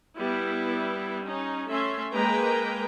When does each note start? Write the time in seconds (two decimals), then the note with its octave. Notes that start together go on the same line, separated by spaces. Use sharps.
0.17 G3 B3 E4
1.24 C#4 D#4
1.68 A3 C#4 E5 C6
2.13 G#3 A#3 A#4 B4 G5 A#5